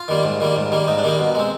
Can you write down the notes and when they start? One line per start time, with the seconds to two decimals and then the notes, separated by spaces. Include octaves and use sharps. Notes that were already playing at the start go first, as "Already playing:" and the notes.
Already playing: F4
0.08 D#3 G3 A#3
0.24 G#2
0.40 D#3 G3 A#3
0.56 G#2
0.72 D#3 G3 A#3
0.87 G#2 D#4
0.98 D4
1.04 D#3 G3 A#3 D#4
1.19 B2
1.35 G#3 C4